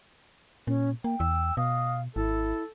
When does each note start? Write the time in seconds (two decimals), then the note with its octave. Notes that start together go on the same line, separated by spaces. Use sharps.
0.67 A#2 C#4
1.04 A#3 G5
1.20 E2 E6
1.57 B2 D#5 F5
2.16 G#1 E4 A4